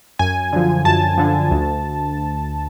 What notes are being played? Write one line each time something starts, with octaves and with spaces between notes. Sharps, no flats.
F#2 G#5
D3 F3
F#2 A5
D3 F3
D2